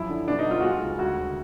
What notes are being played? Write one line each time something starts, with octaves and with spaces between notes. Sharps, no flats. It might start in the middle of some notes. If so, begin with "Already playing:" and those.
Already playing: F#2 F3 E4
D3
B2 D4
D#4
F#3
F4
G#3 F#4
F4
C#2
D2 F#4
D2